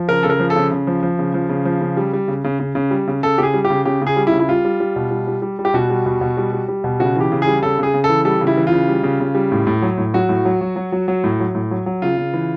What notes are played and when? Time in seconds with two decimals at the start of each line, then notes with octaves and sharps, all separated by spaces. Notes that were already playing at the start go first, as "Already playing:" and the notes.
Already playing: F3
0.08 C#3 A#4
0.23 C#3 A4
0.30 A#4
0.39 F3
0.50 A4
0.56 C#3
0.71 C#3
0.87 F3
1.03 F3
1.19 C#3
1.34 F3
1.49 C#3
1.65 F3
1.81 C#3
1.97 G3
2.13 G3
2.28 C#3
2.44 C#3
2.59 C#3
2.75 C#3
2.91 G3
3.07 C#3
3.23 C#3 A4
3.38 C#3 G4 G#4
3.54 G3
3.65 G4
3.70 C#3
3.85 C#3 G4
4.01 C#3
4.07 G#4
4.16 G3
4.27 E4
4.32 C#3
4.39 E4
4.49 G3 F4
4.65 G3
4.80 G3
4.96 B2
5.11 G3
5.27 G3
5.42 G3
5.59 G3
5.65 G4
5.74 B2 F#4
5.90 G3
6.06 B2
6.21 B2
6.37 G3
6.53 G3
6.68 G3
6.84 B2
7.00 C#3 F#4
7.16 E3 G4
7.32 C#3
7.42 G#4
7.47 G3
7.62 C#3 A4
7.79 C#3 G#4
7.94 C#3
8.04 A4
8.09 E3
8.25 G3 A4
8.41 C#3
8.47 E4
8.57 E3
8.67 C#3 F4
8.88 G3
9.03 C#3
9.20 C#3
9.35 G3
9.52 A2
9.67 A2
9.82 F#3
9.98 A2
10.14 F#3 F#4
10.29 A2
10.45 F#3
10.61 F#3
10.76 F#3
10.92 F#3
11.08 F#3
11.24 A2
11.40 F#3
11.55 A2
11.71 F#3
11.86 F#3
12.02 C#3 F4
12.17 C#3
12.33 E3